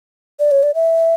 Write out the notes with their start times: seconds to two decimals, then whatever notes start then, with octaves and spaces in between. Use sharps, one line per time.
0.40 D5
0.51 C#5
0.63 D5
0.75 E5